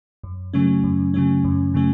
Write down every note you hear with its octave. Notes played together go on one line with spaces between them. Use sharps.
F#2
C#3 F#3 A3 C#4
F#2
C#3 F#3 A3 C#4
F#2
C#3 F#3 A3 C#4